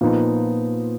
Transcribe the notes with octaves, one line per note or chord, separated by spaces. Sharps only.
A#2 F3 B3 D#4